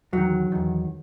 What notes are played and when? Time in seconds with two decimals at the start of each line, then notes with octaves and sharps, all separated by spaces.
0.13 E2 D#3 F#3
0.52 E2 D#3